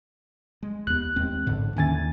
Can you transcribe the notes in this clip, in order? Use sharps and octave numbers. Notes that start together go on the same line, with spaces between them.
G#3
D#2 B3 F#6
D#2 G#3 C4
A1 G#2 D3
D#2 D3 E3 C#4 G#5 A6